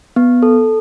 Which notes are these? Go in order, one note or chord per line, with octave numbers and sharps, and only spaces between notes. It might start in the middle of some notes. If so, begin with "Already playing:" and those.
B3
A4